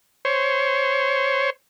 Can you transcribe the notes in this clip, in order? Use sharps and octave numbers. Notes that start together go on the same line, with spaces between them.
C5 C#5